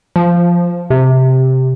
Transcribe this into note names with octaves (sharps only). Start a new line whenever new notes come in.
F3
C3